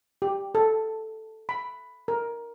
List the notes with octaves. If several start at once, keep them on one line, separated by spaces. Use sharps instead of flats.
G4
A4
B5
A#4